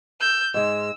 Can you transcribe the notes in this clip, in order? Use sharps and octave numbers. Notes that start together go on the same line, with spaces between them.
E6 G6
G#2 G#3 E6